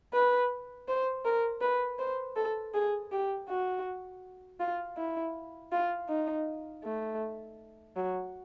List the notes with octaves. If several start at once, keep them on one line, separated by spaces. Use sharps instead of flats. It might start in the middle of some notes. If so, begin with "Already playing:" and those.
B4
C5
A#4
B4
C5
A4
G#4
G4
F#4
F4
E4
F4
D#4
A3
F#3